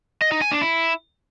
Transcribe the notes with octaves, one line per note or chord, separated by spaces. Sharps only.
D#5
D#4
G#5
D4
E4